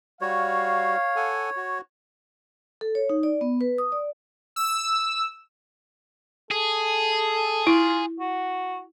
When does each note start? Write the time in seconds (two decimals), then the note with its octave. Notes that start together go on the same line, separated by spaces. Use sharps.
0.21 G3 F#4 C#5 F5
1.16 A4 F#5 G#5
1.57 F#4
2.81 A4
2.95 C#5
3.10 D#4
3.23 D5
3.41 B3
3.61 B4
3.78 D#6
3.92 D5
4.56 E6
6.51 G#4 A4
7.67 E4 F4
8.20 F#4